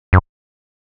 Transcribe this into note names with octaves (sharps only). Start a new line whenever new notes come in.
F#2